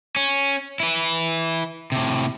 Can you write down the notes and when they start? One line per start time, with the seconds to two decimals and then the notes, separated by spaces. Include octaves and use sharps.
0.16 C#4
0.80 E4 B4
1.92 A2 C3